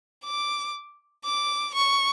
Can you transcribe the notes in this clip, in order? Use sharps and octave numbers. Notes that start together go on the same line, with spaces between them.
D6
D6
C#6